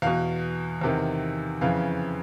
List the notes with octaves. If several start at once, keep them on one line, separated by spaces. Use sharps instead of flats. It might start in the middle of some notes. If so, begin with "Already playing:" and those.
E2 B2 F5
E2 C3 D#3
F2 C#3 E3 F5